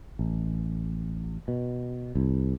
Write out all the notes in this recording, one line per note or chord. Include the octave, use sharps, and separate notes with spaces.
A1
B2
C2